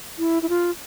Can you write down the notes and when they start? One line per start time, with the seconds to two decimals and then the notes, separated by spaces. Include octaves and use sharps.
0.19 E4
0.43 E4
0.49 F4